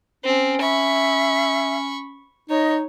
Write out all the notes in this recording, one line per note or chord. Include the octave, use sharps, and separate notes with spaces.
C4 C#4
E5 B5 C#6
D#4 C#5 D#5